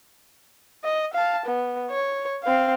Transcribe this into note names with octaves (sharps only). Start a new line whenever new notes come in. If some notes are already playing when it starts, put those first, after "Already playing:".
D#5
F5 A5
B3
C#5
C4 F5